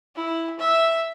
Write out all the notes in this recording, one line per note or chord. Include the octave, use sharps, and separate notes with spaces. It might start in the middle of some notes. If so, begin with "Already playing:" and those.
E4
E5